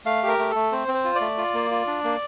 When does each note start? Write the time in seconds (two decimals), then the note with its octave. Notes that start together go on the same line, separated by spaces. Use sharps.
0.05 A3 F5
0.23 G4 A#4
0.39 A3
0.51 A3 A4
0.72 C4 C5
0.88 C4
0.94 C5
1.05 F4
1.15 D5
1.21 A3
1.38 F4
1.54 A#3
1.71 F4
1.87 D4
2.04 A#3